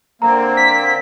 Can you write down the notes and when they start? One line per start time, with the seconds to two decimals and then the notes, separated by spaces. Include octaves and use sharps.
0.22 D3 A#3 C4 A#5
0.57 B6